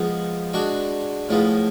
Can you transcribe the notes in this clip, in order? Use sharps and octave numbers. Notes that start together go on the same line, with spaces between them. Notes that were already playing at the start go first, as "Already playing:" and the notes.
Already playing: F3 G#3 B3
G#3 D4 F#4
A2 F3 G#3 B3